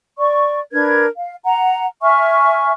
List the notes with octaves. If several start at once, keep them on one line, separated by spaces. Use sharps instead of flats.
D5 C#6
D4 A#4 B4 G#6
F5
F#5 A#5
E5 G#5 C#6 F6